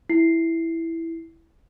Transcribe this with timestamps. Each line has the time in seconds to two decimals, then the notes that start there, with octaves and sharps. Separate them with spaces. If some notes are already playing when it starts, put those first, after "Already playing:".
0.09 E4 C7